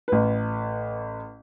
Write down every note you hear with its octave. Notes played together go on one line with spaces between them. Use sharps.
A1 B4